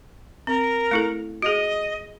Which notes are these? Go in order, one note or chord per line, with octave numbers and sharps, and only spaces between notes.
C4 A#4
A3 E4 A4
F#4 G#4 D#5